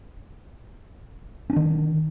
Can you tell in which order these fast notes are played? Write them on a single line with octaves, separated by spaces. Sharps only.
C#4 D4 D#3